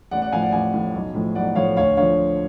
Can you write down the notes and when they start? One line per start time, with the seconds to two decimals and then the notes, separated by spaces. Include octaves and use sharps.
0.11 A1 D5 F#5
0.22 D5 F#5
0.32 A2 F3 F5 G#5
0.42 D5 F#5
0.52 A1 F5 G#5
0.73 A2 F3
0.94 B1
1.14 A2 F3
1.35 B1 D5 F#5
1.55 A2 F3 C#5 F5
1.77 D2 C#5 F5
1.97 D3 F3 C#5 F5